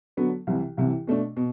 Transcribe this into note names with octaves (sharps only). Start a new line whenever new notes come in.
D3 F#3 B3 F#4 A4
C2 C3 E3
C2 C3 E3
B2 A3 D4
B2